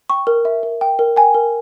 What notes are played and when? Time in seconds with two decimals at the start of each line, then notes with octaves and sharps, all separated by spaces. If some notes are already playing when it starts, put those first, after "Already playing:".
0.10 G5 C#6
0.27 A#4
0.45 E5
0.63 A#4
0.81 G5
0.99 A#4
1.16 G5 G#5
1.34 A#4